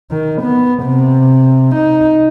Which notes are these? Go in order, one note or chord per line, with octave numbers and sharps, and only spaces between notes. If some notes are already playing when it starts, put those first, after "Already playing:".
D#3
B3
C3
D#4